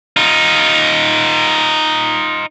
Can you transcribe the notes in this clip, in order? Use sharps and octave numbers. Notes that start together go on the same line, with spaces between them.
D#4 F4